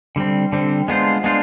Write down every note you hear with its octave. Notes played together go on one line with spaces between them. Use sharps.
D3 G3 C4
D3 G3 C4
G#3 B3 D4 F4 C5
G#3 B3 D4 F4 C5